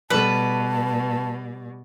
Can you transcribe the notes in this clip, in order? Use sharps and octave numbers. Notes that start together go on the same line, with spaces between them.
B2 G3 A4 B4 A5